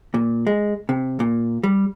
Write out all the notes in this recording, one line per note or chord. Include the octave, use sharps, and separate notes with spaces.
A#2
G#3
C3
A#2
G3